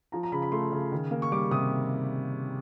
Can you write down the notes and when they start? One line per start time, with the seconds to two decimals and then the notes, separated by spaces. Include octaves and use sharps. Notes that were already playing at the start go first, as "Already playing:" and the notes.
0.12 F3 A#5
0.23 A#5
0.32 C#3 B5
0.42 B5
0.52 A3 C6
0.72 C#3
0.92 D#3
1.11 A#3
1.22 C#6
1.32 G3 D6
1.51 C3 D#6